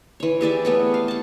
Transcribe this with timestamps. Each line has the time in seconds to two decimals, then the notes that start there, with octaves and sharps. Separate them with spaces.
0.20 E3 C#5
0.41 G4 G#4 D5 E5
0.65 A3 B3 C#5
0.94 F5
1.08 F#5 A5